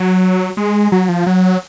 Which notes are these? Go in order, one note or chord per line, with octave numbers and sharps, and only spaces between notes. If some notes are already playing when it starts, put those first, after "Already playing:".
Already playing: F#3
G#3
F#3
F3
F#3